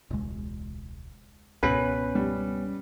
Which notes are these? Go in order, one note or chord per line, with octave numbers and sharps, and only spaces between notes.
E1 C#2 G#3
C#2 G#2 B2 B3 C#4 B4
G3